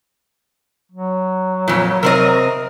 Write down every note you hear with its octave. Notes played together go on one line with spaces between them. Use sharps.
F#3
F2 A#2
C3 C4 A#4 D#5